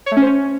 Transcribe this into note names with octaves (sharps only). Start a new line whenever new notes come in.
C#5
A3
C#4
C5
C#4